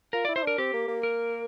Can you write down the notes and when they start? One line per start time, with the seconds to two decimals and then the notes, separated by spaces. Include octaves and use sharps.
0.13 F4 A#4
0.25 E4 D5
0.36 E4 C5
0.43 D4 A#4
0.58 C4 G4
0.74 A#3
0.88 A#3
1.03 A#4